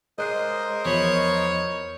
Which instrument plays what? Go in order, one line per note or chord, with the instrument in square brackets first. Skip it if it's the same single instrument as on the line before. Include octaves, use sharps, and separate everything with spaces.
[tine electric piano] G#3 F#6 C7 [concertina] A#4 C5 [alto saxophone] D#5
[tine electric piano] E2 F3 B5 [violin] C#5